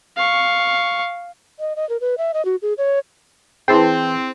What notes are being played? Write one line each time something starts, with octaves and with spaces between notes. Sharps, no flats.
F5 C#6
D#5
D#5
A#4
B4
E5
D#5
F#4
G#4
C#5
E3 C4 E4 G#4 G5 A5 C6